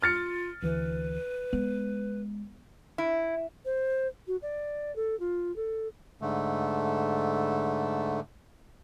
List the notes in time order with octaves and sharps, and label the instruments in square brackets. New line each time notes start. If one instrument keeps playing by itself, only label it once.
[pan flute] F4 [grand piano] F6 A6 C#7
[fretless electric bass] D2 E3 [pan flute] B4
[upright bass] G#3 [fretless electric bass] B3
[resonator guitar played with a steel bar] E4
[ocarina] C5
F#4
D5
A4
F4
A4
[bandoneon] G#2 D3 A3